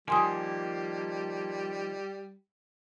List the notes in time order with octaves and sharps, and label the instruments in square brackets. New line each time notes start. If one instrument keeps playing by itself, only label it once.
[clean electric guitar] D#3 F3 A#3 [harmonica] G3 [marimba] G#5 C6 D#6